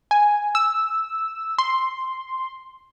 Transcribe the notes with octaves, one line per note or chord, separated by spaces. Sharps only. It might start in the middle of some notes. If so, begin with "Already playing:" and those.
G#5
E6
C6